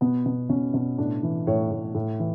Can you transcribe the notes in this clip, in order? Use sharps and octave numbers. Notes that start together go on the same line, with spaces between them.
B2 B3
B2
B2 C#4
B2
A2 D4
E3
A2 C#5
A2
A2
E3